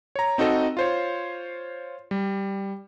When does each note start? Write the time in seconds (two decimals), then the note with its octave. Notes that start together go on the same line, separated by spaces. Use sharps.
0.15 C#5 A#5
0.38 C4 D#4 F#4 A4 D#5
0.77 F4 C5 C#5
2.11 G3